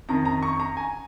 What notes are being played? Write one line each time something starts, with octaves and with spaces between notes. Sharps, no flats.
F2 D#3 A#5
A#5
C#6
A#5
G#5